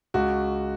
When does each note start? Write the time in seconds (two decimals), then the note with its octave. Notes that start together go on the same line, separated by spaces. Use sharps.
0.14 C#2 F#4